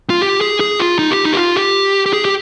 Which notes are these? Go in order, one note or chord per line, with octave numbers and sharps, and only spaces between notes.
F4
G4
G#4
G#4
F4
D#4
G4
D#4
G4
F4
G4
G4
G#4
G4